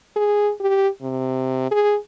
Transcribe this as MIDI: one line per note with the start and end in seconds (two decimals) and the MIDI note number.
0.16 0.52 68
0.60 0.88 67
1.02 1.71 48
1.71 1.97 68